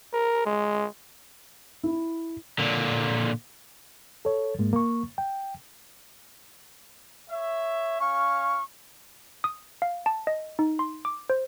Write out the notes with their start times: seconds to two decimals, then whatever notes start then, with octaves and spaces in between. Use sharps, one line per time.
0.13 A#4
0.46 G#3
1.83 E4
2.59 A#2 D3
4.25 A4 C#5
4.59 G#2 G#3 A#3
4.73 A#3 C#6
5.18 G5
7.30 C#5 E5
8.00 C#4 F5 C#6
9.44 D#6
9.82 F5
10.06 A5
10.27 D#5
10.59 D#4
10.79 C6
11.05 D6
11.30 C5